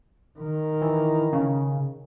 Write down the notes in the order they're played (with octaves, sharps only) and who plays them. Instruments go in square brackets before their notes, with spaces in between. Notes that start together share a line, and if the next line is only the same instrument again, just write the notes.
[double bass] D#3
[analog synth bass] E3
C#3